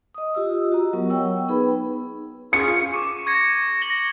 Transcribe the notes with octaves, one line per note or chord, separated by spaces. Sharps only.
D#5 D#6
F4 G4 D#5 E6
F#4 D#5 A#5
F#3 B3 A#4 C#6
C#5 F#5 G5 C#6 E6
B3 D#4 G#4 B4 B5
C#4 F4 G#4 C#7
C#6 D6
C#6 G#6 A#6 C#7
A#6 F#7 G7